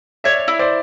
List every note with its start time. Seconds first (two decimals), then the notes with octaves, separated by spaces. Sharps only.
0.24 C#5 D5 E5
0.48 E4
0.59 C5 D5